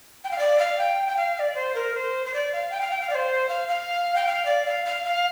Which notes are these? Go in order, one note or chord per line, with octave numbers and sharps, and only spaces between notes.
G5
F5
D5
F5
G5
G5
F5
F5
D5
C5
A#4
C5
C5
D5
F5
G5
F5
G5
F5
D5
C5
F5
F5
G5
F5
D5
F5
F5
F5